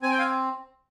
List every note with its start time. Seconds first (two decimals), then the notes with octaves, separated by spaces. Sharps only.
0.02 C4 G#5
0.11 G5
0.19 F5 G#5